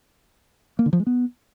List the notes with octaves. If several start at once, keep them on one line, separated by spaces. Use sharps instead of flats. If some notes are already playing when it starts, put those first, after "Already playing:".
A#3
D3
F3
G#3
B3